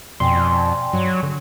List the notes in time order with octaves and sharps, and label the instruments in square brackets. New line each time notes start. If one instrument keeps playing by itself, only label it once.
[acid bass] F2 [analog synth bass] B2 [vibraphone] D5 G5 G#5 [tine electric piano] C6
[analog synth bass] G2 [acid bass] F#3
[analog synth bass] D3